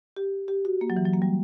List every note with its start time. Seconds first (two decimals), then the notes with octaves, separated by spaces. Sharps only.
0.16 G4
0.48 G4
0.65 F#4
0.81 A#3
0.90 F#3
0.97 E3
1.06 F#3
1.13 A#3
1.22 G3